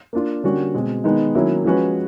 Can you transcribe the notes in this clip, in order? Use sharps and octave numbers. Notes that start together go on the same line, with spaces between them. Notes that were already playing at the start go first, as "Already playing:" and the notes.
A#3 D4 F4
D3 G3 A#3 C#4 F#4
B2 G#3 C4
D#3 G#3 B3 D#4
D#3 F#3 A#3 C#4 E4
F3 G#3 C#4 F#4 B4